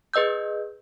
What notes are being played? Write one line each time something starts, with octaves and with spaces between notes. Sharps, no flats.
G#4 B4 D#5 E6 G6